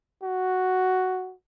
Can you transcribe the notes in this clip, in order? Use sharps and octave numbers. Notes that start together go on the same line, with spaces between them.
F#4